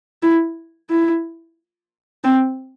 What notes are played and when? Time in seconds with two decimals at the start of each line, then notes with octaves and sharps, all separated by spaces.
0.23 E4
0.90 E4
2.24 C4